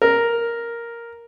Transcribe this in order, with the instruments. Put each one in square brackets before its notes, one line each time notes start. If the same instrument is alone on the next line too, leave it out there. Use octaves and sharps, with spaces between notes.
[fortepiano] A#4